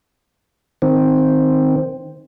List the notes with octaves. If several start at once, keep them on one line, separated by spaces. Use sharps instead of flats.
D#3 C4